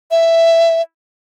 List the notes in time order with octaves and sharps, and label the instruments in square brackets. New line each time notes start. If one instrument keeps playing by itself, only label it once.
[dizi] E5